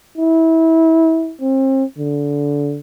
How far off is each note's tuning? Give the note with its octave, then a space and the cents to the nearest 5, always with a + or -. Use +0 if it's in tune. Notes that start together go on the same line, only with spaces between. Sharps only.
E4 -25
C4 +35
D3 -25